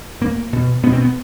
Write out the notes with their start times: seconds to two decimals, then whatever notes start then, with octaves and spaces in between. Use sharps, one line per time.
0.21 A2 A#3
0.53 B2
0.83 B2 B3
0.93 C4
1.01 B3